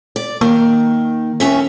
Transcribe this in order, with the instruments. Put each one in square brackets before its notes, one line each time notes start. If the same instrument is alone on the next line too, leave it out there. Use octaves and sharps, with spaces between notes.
[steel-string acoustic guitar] D5
[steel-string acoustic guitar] D#3 [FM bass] A#3
[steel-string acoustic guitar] D#2 C#4 E5